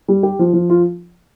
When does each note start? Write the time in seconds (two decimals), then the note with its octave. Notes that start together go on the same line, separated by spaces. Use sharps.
0.08 G3
0.23 G4
0.39 F3
0.53 F3
0.70 F4